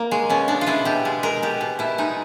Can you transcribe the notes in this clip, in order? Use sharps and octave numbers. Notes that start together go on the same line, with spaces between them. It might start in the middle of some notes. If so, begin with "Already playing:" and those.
Already playing: A#3
G#3
B2 C#4
G#3 D4
F4
G#3 E4
B2 G4
G#3
G#3 A#4
B2 G4
B2
B2 E4
G#3 D#4